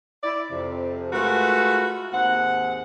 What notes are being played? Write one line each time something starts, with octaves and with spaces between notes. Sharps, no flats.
E4 D5
F2 C3
G#3 A3 F4 F#4 A#4 B4
D#2 G#2 C4 F#5